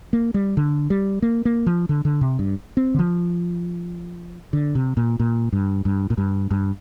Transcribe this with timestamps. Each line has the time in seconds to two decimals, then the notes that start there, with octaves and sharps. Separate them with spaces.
0.13 A#3
0.34 G3
0.57 D3
0.90 G3
1.22 A#3
1.45 A#3
1.66 F3
1.89 D3
2.05 D3
2.21 C3
2.39 G2
2.77 C4
2.94 D3
2.99 F3
4.53 D3
4.75 C3
4.97 A#2
5.20 A#2
5.52 G2
5.85 G2
6.10 A#2
6.18 G2
6.51 G2